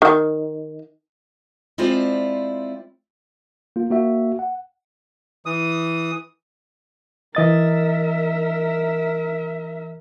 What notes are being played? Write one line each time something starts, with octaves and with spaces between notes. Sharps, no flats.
D#3
G#3 C4 E4 F4 C5 D5
A#3 F4
A#3 F#4 E5
F#5
E3 D#6
E3 A#4 D#5 E5 A6